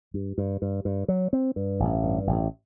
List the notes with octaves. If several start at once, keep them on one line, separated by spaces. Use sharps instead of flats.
G2
G2
G2
G2
F#3
C4
G2
A1
G2
A1